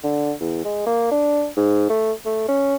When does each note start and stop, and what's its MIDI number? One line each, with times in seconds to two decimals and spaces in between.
0.03 0.32 50
0.40 0.61 40
0.64 0.84 56
0.86 1.09 58
1.11 1.47 62
1.56 1.86 44
1.89 2.12 57
2.25 2.43 57
2.48 2.76 61